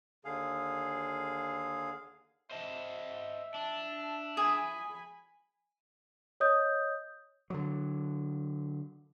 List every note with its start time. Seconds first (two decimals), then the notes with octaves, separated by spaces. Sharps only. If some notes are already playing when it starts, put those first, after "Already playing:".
0.25 D#2 D3 G#4 F5
2.51 C5 D#5 E5 A5
3.54 D4 A5
4.37 G#4 G#5 B5
6.40 C#5 D#5 D#6 G6
7.50 D3 F#3